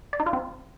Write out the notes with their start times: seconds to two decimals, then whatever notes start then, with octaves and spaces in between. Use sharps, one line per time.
0.13 D5
0.20 D#4
0.26 F4
0.33 C4